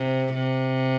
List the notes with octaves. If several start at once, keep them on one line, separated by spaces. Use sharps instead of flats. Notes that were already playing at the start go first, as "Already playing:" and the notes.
Already playing: C3
C3